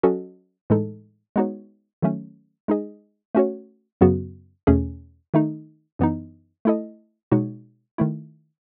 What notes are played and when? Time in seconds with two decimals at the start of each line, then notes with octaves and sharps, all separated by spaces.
0.03 F#3 C#4 F#4 A4 D#5
0.70 A2 E3 G#3 D#4 A4
1.36 G#3 B3 D#4 F#4 C#5
2.02 D#3 F#3 A3 C#4
2.68 G#3 D#4 G#4 D#5
3.35 A3 C#4 F#4 C#5
4.01 F#2 C#3 F#3 B3 F#4
4.67 E2 B2 A3 C#4 G#4
5.34 D#3 A3 D#4
5.99 F#2 E3 B3 D#4
6.65 A3 E4 A4 D#5
7.31 B2 G#3 D#4 F#4 C#5
7.98 D#3 A3 E4